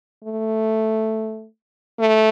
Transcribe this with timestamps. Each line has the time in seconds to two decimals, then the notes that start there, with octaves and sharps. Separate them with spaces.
0.24 A3
1.99 A3